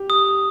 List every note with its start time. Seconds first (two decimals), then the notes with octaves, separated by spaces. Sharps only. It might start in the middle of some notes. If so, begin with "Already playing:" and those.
Already playing: G4
0.10 D#6